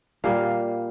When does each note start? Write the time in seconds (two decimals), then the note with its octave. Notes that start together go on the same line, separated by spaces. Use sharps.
0.24 A#2 G3 A#3 F5